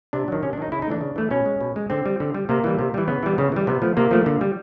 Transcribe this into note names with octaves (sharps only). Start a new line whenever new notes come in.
C3 D4
D#3 F#3
C3 C#4
D4
D#3 F#3 D#4
C#3 E4
D#4
E3 A3 D4
C#3
E3 A3
B2 C#4
G#3
B2
G#3
D3 C4
G3
D3
G3
C3 A#3
E3 G3
C3
E3 G3
C#3 B3
E3 G3
C#3
E3 G3
C3 B3
F3 A3
C3 A#3
F3 A3
D3
G3